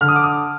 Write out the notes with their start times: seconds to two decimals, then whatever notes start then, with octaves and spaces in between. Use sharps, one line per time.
0.01 D3 F6
0.08 D#6
0.16 D6
0.24 D#6